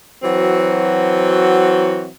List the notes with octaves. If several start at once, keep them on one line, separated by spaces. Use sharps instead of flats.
E3 F#3 C4 F#4